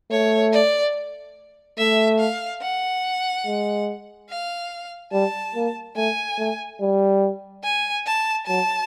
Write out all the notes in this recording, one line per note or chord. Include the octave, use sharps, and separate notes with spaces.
A3 C#5
D5
A3 E5
F5
F#5
G#3
F5
G3 A5
A#3
A3 G#5
A3
G3
G#5
A5
F#3 A5